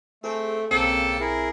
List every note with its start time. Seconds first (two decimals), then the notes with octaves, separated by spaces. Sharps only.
0.24 A3 C4 G#4 A4
0.71 B1 C#3 A#3 C4 A4 G5
1.20 E4 G#4 A#4